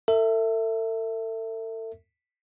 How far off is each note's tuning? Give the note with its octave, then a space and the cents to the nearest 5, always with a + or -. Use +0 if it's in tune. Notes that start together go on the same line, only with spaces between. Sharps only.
A4 +40 E5 +0